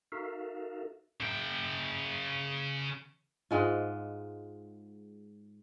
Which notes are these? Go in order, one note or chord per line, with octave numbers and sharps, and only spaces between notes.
D#4 F#4 A4 A#4 E5 F5
C#3 G5
G#2 G#3 F4